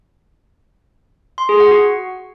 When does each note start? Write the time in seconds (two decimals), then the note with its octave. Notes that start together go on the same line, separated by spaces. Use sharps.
1.38 C6
1.49 G#4
1.60 F#5
1.71 F#4